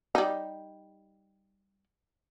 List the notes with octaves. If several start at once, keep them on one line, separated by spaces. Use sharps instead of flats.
G3 D#4